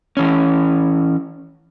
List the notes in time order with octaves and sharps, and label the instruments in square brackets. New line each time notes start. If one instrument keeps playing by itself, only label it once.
[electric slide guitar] E3 C#4